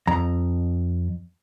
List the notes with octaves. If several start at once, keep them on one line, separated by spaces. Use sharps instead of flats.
F2 A#5